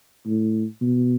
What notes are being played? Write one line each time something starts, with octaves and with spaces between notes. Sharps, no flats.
A2
B2